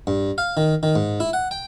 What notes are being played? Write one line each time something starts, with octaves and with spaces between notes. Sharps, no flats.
G2
F5
D#3
D#3
G#2
E4
F#5
G5